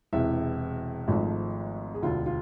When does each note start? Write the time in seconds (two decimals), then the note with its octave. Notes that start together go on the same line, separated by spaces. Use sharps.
0.13 E1 E2 C3 E5
1.08 G#1 G#2 F3 A3
1.94 G#4
2.02 E1 D2 D3 F4
2.26 F4